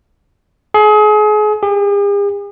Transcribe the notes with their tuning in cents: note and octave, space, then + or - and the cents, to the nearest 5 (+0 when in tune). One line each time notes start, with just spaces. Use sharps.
G#4 +35
G#4 -45